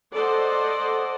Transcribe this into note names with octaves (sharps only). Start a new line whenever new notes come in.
A4 C5 D5 D#5 F#5